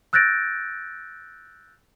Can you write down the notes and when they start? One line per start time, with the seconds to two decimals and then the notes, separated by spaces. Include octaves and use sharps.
0.13 E6 F#6 G6 A6 A#6 D7